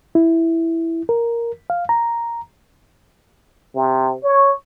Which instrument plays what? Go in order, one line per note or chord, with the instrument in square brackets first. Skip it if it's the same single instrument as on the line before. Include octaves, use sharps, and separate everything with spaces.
[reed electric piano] E4
A#4
F5
A#5
[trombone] C3
C#5